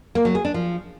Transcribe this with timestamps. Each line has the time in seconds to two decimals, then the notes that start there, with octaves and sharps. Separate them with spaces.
0.15 A#3
0.25 F#3
0.35 G#4
0.45 D4
0.54 F3